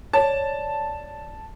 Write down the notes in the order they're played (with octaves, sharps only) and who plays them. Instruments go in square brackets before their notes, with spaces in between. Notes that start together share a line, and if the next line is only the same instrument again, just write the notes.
[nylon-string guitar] C#5 D5 [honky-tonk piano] A5